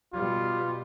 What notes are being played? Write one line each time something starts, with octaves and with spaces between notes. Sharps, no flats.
B2 G3 F4